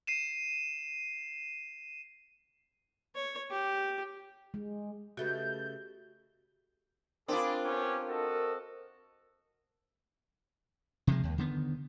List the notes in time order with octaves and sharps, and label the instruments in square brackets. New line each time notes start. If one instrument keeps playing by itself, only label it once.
[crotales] C7 D#7 E7
[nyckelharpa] C#5
G4
[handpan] G#3
[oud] C#3 A3 B3 [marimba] F#4 G4 D#5 [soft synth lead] G6
[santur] C4 [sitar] D4 F4 [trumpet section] G#4 B5 D6 [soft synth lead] A#4
[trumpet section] B3 C#4 G4
F#4 A4 D#5
[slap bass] C3 F3 G#3
D#2
D3 D#3 B3